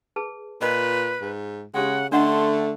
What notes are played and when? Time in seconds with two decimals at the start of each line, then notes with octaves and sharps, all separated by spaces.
0.16 G#4 B4 A5
0.61 A#2 F4 B4 D#5
1.22 G#2
1.74 C#3 G#3 C#4 G4 F#5 G5
2.12 D3 A3 D4 D#5 F#5 C6